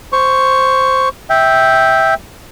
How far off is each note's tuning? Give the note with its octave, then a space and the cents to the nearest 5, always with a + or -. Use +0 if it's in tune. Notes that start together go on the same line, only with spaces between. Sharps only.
C5 +0 C#6 +5
E5 -10 G5 +0